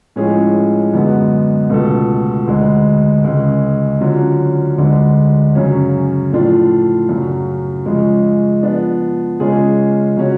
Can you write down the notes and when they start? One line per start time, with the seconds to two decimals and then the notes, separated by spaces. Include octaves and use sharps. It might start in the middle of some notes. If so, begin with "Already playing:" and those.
0.16 A2 F3 G#3 C#4 G#4
0.93 F#2 D3 G#3 B3 F#4
1.70 C#2 B2 A3 F4 A4
2.47 D2 D3 G#3
3.24 C#2 C#3 G#3
4.01 D3 F#3 C#4 F4
4.78 D2 D3 G#3
5.55 F#2 C#3 F#3 C#4
6.32 A2 F3 A3 D4 F4
7.09 F#2 C#3 F#3
7.86 C#3 F3 G#3
8.63 F3 B3 D4
9.40 C#3 G#3 C#4 F4 G#4
10.17 C#3 F#3 C#4 F#4